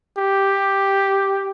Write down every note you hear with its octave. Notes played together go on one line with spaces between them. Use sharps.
G4